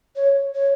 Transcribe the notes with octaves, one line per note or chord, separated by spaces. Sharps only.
C#5
C#5